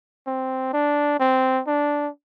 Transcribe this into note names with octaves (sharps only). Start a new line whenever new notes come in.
C4
D4
C4
D4